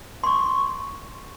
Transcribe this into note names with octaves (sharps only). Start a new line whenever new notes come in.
C6 C#6